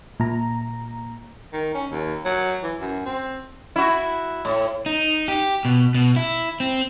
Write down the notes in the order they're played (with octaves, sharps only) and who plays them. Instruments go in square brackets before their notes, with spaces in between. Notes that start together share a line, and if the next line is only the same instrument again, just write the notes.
[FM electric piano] A#2 A#5
[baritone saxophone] D#3
C#4
D#2
F#3
E3
F#2
C4
[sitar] E4 F#4
A2
[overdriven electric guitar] D#4
G4
B2
B2
E4
C4